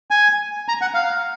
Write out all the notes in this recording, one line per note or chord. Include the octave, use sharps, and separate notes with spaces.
G#5
A#5
F#5
F5